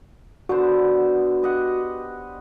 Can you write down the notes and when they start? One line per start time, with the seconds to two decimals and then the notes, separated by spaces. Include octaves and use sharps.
0.49 D3 B3 F#4 C5
1.43 G4 D#5 F#5